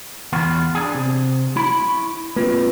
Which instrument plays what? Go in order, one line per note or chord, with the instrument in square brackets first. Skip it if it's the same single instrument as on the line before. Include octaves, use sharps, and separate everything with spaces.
[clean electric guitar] E2 B3 F4
D4 G#4
C3
E4 B5
[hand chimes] C#6
[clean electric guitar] A#3 C4 [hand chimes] F4 B4